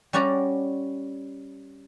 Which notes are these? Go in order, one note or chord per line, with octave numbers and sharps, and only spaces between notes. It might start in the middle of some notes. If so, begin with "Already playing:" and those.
G3 C#4 F#4 D5 A#5